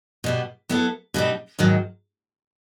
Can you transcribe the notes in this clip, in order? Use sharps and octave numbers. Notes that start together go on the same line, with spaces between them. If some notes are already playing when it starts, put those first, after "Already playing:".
B2 G3 B3
F#3 B3 E4 A4
B2 G3 C4 D#4
G#2 D#3 F#3